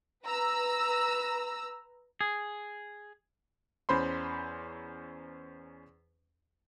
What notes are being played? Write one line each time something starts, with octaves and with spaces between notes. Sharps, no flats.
B4 A#5 E6
G#4
E2 C#4 C5 B5 C6